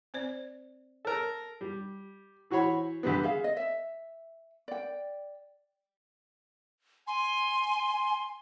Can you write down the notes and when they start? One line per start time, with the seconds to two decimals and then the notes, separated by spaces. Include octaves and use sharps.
0.14 C4 C5 D5
1.05 A4 A#4
1.61 G3
2.50 E3 F#4 C5 C#5 B5
3.03 D2 D3 G3 B3
3.23 G#4 E5 F5
3.44 D#5
3.57 E5
4.68 D5 G5
7.07 G#5 C6